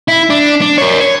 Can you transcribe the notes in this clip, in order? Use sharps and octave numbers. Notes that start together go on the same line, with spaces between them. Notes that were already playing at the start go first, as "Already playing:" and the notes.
E4
D4
D4
A#4 C#5
C#5